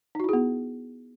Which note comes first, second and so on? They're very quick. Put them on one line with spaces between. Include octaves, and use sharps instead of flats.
D#4 F#4 E4 G#4 B3